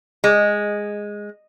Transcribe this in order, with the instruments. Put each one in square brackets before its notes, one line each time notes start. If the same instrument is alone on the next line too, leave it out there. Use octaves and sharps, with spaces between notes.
[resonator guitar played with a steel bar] G#3